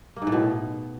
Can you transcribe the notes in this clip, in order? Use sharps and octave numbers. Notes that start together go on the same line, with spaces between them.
A#3
G#2
A2
B2